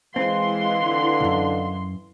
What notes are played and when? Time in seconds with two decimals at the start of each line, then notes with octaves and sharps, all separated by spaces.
0.16 E3 G#3 C4 B4 D#5 F5 C6
0.82 D3
1.21 C2 F#2